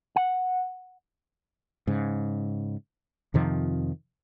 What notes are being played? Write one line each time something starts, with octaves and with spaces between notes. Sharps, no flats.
F#5
G#2 C#3
F2 C3 D#3 F3